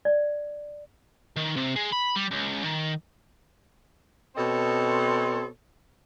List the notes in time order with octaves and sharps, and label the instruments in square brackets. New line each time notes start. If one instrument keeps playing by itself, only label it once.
[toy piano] D5
[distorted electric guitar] D#3
C3
G#3
B5
G3
C#2
D#3
[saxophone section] B2 C4 A4 C5 C#5 D#5